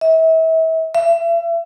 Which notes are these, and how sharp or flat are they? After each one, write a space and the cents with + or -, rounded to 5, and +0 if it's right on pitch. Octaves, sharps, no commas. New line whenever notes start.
E5 -35
E5 +35